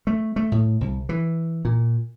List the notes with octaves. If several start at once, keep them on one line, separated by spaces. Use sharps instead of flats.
A3
A3
A2
C2
E3
A#2